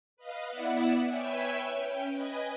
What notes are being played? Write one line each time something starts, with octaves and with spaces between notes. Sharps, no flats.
B4 D#5 F5
B3 E4 D5 E5 F#5
B4 C#5 E5 G5 G#5
C#4 G5
B4 D#5 G#5